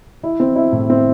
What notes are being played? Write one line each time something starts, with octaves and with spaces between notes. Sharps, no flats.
E4
C4
E4
A2
C4